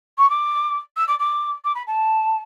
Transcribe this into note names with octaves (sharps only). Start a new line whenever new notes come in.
C#6
D6
E6
D6
D6
D6
B5
A5